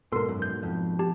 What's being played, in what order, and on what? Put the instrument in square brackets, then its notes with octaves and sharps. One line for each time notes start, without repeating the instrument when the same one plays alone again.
[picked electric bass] G#2 B2 [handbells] A4 A#4 [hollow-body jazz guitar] C6
[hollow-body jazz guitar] F#2
[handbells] G6
[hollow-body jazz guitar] F2
[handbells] G4 A5